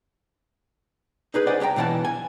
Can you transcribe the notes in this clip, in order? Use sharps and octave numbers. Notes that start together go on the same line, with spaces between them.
D#4 G#4 B4
B4 C5 D5 D#5 F#5 G#5
C2 C#4 A4 G5 A#5
B1 B2 E3 F#5 A5
G#5